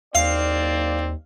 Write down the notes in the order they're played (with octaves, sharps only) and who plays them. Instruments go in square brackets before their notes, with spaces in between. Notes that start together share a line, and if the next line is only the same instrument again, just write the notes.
[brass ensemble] F#1 D#4 D5 [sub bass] D#2 [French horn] C4 [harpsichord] F5